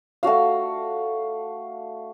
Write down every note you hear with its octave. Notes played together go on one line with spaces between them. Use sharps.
A3 D4 F#4 F5